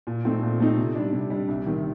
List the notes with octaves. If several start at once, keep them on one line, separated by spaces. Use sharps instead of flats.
A#2
A3 C4 D#4
A#2
A3 C4 D#4
C3
G3 D4
C3
G3 D4
C2
C3 D#3